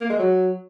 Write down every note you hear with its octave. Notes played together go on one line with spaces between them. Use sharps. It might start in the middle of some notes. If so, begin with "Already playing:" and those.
A#3
G#3
F#3